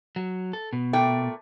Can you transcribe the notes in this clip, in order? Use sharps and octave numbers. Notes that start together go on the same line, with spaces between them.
F#3
A4
B2
A#2 A3 G5